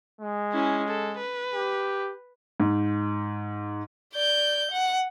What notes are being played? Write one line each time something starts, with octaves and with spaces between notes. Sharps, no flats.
G#3
C#4 E4
A4
B4
G4
G#2
D5 G6
F#5